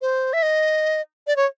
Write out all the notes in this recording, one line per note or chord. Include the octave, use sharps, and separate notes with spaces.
C5
E5
D#5
D5
C#5